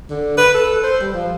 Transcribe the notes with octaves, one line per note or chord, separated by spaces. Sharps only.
D3
B4
A4
C5
G3
F3